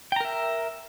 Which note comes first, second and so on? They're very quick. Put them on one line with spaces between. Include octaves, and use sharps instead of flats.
G5 A#5 A#4 E5